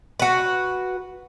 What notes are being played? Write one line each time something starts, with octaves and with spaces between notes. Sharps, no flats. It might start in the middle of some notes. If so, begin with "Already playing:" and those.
F#4 B4